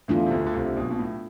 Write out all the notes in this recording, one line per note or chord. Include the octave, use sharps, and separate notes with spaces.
E2 E3 A3 D4 F4
C3
D2 D3
D3
C2 C3
C3
B1 B2
B2
A2